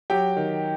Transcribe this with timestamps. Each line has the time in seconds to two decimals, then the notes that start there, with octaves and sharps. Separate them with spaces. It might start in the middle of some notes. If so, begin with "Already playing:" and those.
0.10 F#3 G4 G5
0.36 D#3